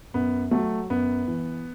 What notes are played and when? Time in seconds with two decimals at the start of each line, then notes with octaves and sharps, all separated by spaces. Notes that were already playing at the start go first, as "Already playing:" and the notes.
0.14 F#2 B3
0.51 F#3 A3
0.90 F#2 B3
1.28 E3